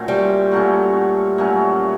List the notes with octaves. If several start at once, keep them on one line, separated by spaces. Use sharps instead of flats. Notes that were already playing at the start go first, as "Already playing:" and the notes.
Already playing: A#2 F#3 A3 C#4
G3
A#2 F#3 A3 C#4
A#2 F#3 A3 C#4